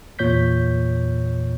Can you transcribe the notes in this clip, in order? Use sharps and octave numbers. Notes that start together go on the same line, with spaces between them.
E2 A#2 C#5 G6 B6